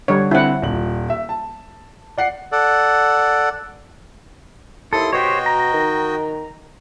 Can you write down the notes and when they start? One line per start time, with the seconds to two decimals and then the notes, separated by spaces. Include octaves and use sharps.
0.08 D3 G3 C#5
0.31 D3 C4 E4 F#5
0.62 D#1 F#7
1.10 E5
1.29 A5
2.18 D5 F#5 C7
2.52 A4 D5 F#5
4.93 D#2 E4 A4 C6 D#6
5.13 B2 F#4 G4 C5 C#5 D#5 G5
5.46 A#5
5.73 D#3